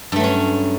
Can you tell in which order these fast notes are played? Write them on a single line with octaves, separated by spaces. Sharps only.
G2 A3 F#3 C#4